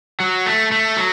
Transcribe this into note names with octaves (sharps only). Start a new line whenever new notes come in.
F#3
A3
A3
F#3